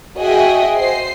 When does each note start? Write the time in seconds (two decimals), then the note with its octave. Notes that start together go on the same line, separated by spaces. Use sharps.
0.19 F#4 G#4 D#5 E5 G5
0.77 C5 D#5 C7